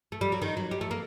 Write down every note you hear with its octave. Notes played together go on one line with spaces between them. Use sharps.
A3
G3
F#3
D#3
F#3
G3
A3
A#3